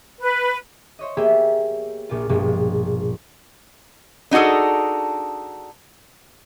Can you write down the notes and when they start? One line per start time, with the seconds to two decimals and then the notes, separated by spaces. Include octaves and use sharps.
0.20 B4
0.99 C5 C#5 D#5
1.17 A#3 B3 G4 G#4 E5
2.09 A#1 A#2 F4
2.29 A#1 G2 B2 F3 G3 G#3
4.31 D4 D#4 F#4 G#4 A4